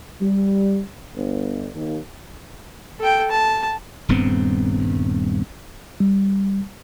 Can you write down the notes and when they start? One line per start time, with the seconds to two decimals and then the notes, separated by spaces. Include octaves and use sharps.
0.20 G3
1.15 G1
1.74 D#2
3.00 A4 G5
3.31 A5
4.09 D#1 G2 B3 C4
6.00 G3